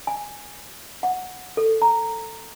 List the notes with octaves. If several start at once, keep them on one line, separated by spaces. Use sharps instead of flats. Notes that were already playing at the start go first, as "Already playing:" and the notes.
G#5
F#5
A4
A#5